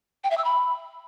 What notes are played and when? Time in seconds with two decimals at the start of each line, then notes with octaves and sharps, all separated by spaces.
0.24 G5
0.31 E5
0.38 E6
0.44 B5